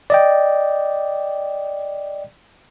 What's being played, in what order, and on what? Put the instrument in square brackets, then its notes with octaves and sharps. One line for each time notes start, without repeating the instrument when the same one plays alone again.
[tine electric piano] D5 D#5 G5